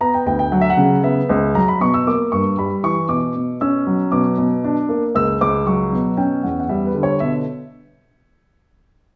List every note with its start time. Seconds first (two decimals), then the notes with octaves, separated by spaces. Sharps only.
0.01 B3 A#5
0.14 G5
0.26 D2 G5
0.39 G5
0.52 F#3 F#5
0.61 E5
0.70 F#5
0.77 C#3
1.03 B3 E5
1.29 C#2
1.55 F#3 A#5
1.68 B5
1.81 B2 C#6
1.94 E6
2.07 A#3 D6
2.32 G2 C#6
2.58 G3 B5
2.83 E3 C#6
3.09 B2 D6
3.36 B2
3.61 C#4 E6
3.87 F#3
4.12 B2 D6
4.38 B2
4.64 D4
4.89 A#3
5.15 C#2 E6
5.41 C#2 D6
5.66 F#3 C#6
5.93 B2
6.17 C#4 G5
6.43 E2 F#5
6.60 F#5
6.69 G3 E5
6.87 B4
6.95 D3
7.03 C#5
7.20 B2 E5